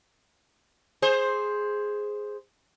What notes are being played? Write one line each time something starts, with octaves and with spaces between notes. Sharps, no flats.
G#4 C5